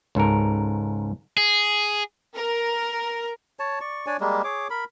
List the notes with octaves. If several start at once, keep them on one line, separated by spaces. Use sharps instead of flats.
C#2 G#2 A4 A#4
G#4
A#4
C#5 A5
D5 C#6
D4 C#5 D5 G#5
G3 G#3 A#3
G#4 C#5 D6
A#4 B5